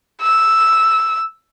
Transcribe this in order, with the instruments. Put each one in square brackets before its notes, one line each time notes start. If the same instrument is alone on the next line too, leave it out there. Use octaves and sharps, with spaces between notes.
[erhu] E6